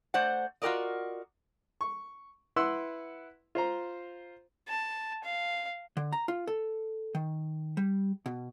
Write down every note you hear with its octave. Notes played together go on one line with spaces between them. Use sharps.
A3 C5 D5 F#5
F4 F#4 G#4 A#4 D5 D#5
C#6
E4 B4 F#5 C6 E6
F4 C5 A#5
A5
F5
D3
A#5
F4
A4
D#3
G3
B2